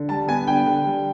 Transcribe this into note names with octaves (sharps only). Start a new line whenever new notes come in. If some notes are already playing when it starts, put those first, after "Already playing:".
Already playing: D3
G3 A5
B3 G#5
D3 G5
D3
G3